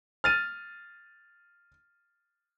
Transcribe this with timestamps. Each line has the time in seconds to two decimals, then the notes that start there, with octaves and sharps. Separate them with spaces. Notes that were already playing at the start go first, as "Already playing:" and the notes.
0.24 F6 A6 D#7